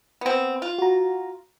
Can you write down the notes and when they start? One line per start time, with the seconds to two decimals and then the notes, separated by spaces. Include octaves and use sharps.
0.21 B3 C4
0.62 F4
0.79 F#4 A#5